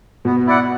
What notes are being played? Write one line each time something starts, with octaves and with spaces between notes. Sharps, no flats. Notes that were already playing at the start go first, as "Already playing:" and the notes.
B2 B3
E4 D5 F#5